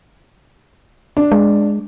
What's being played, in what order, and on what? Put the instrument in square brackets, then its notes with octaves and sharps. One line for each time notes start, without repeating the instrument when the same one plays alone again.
[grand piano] D4
[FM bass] G#3